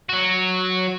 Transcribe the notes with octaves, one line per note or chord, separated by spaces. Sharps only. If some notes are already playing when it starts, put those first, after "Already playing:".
F#3 F#4